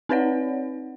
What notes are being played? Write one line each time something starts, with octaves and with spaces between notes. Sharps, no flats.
C4 D#4 B4 C#5 D5 F#5